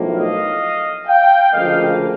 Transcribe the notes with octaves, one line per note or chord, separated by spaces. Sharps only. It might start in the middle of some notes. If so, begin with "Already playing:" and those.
Already playing: B1 A2 F3 A#3
D#5 F5
F5 G5
D2 C#3 F3 A#3 D#5 F5